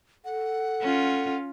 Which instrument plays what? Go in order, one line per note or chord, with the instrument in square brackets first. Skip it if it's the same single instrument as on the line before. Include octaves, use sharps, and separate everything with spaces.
[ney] A4 [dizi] F#5
[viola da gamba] C#4 F4